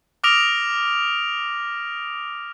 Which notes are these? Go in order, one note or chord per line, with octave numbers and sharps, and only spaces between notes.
D6 D#6 F6 A#6 D7 F7